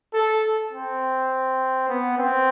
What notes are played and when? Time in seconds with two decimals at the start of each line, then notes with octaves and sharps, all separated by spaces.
0.14 A4
0.73 C4
1.88 B3
2.18 C4